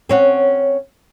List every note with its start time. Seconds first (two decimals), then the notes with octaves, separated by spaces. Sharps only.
0.09 C4 C#4 F#4